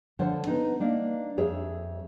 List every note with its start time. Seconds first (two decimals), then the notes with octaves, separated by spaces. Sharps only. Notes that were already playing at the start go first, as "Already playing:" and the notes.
0.19 D3 F3 C5 C#5 F#5 A5
0.47 B3 D#4
0.80 A#3 D4 D#4
1.37 F2 G#4 C#5 E5